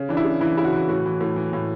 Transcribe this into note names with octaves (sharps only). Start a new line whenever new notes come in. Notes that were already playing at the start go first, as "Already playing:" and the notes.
Already playing: C#3
E3 D4
E4
C#3
E3 E4
C#3 E4
F#4
E3
A2 F#4
E3
A2
E3
A2